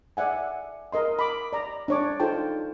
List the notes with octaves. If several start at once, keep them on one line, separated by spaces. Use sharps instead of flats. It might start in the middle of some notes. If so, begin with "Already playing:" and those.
D5 E5 F#5 G#5
A#4 D#5 C6
B5 D6
D5 A#5
D4 C#5 D6
D#4 F4 A4 C5 G5 A5